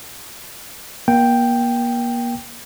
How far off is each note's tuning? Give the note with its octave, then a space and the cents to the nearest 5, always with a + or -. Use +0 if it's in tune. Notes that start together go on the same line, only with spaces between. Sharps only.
A#3 +35 G5 +0